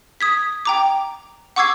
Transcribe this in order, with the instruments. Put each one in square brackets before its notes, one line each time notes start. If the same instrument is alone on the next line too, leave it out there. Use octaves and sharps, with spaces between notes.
[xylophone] D#6 G#6 B6
G5 A#5 D6
F#5 C#6 D6 E6 G#6 C7